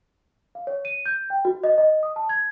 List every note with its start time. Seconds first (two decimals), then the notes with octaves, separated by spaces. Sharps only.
0.55 F5
0.67 C#5
0.85 D#7
1.06 G6
1.30 G5
1.45 F#4
1.64 D#5
1.78 D#5
2.03 D#6
2.16 A5
2.29 G#6